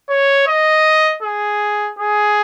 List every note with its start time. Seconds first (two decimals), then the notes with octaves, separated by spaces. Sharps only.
0.10 C#5
0.47 D#5
1.23 G#4
1.99 G#4